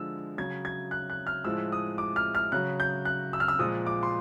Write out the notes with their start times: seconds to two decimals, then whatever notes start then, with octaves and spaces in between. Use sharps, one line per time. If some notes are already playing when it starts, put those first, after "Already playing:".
Already playing: D3 F3 G#3 E6
0.38 C#3 F#3 G#6
0.65 G#6
0.91 F#6
1.10 F#6
1.27 F6
1.44 A2 F3 G#3 E6
1.72 D#6
1.98 D6
2.16 F6
2.35 F6
2.52 C#3 F#3 F#6
2.80 G6
3.05 F#6
3.33 E6
3.40 F6
3.48 E6
3.59 A#2 F3 G#3 D#6
3.87 D6
4.03 C6